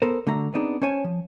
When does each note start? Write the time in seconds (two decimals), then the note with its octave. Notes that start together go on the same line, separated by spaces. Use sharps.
0.02 B3 A4 A#4 C5
0.27 D3 A3 F#4 A#5
0.54 B3 C4 D4 D#4 G#4
0.82 C#4 C5 C#5 G#5 A5
1.04 F3